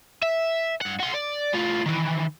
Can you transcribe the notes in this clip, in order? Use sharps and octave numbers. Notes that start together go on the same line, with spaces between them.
E5
G2 F#5
F#4 C6
D5
A2 F4
D#3 E3